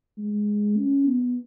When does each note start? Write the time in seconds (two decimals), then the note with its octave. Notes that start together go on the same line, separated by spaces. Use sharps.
0.18 G#3
0.77 C#4
1.07 B3